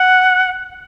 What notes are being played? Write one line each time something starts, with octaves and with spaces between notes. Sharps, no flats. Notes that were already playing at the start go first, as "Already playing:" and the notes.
Already playing: F#5